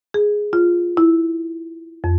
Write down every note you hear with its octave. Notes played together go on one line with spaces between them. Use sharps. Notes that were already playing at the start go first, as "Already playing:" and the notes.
G#4
F4
E4
F2